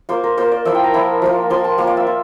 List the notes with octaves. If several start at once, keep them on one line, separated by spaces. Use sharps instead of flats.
A#3 F4 C5
A#4
A#3 F4 C5
D5
F3 A#3 E4 E5
G5
A#5
F3 A#3 E4
F3 A#3 F4
F3 A#3 F4 C6
A5
A#3 F4 F5
D5
E5
F4